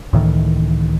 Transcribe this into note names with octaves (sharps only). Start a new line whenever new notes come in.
C#2 A2 D#3 E3